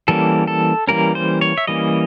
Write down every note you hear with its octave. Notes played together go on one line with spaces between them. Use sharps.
E3 G3 A#3 C#4 A4
A4
E3 G3 A#3 C#4 A#4
C5
C#5
E5
E3 G3 A#3 C#4 D#5